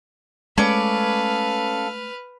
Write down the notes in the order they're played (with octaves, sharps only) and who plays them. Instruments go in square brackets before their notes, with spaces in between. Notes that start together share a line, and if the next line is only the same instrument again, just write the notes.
[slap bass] G#3 A3 [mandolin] C#4 D5 [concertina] A4 F5 [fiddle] B4 F6